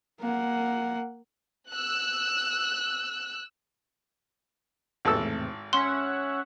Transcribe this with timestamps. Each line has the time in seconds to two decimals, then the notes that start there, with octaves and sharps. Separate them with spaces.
0.20 A#3 F#5
1.71 E6 F#6
5.05 G#1 E2 A2 C3 A4 E6
5.73 C#4 E5 F#5 C6